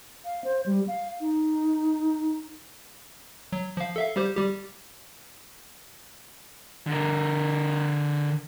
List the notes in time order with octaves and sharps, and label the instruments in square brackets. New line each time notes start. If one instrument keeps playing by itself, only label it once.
[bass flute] F5
C5
G3
F5
D#4
[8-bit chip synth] F#3
F3 F5
A4 E5 F5
G3 G4 C5
G3 G4
[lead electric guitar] D3 A#4